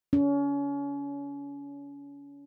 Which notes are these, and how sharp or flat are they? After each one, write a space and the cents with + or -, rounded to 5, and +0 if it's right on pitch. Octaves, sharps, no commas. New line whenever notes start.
C#4 +35